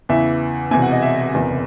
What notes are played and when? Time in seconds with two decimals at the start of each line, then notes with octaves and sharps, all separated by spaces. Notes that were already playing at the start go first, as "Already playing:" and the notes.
0.09 E2 C#3 E3 E5
0.71 E1 E2 C3 G#5
0.82 F#5
0.92 D#5
1.02 E5
1.33 F#1 E2 C3